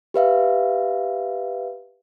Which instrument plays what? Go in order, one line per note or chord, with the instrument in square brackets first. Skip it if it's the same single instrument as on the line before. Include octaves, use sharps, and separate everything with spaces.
[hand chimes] G4 B4 E5 F5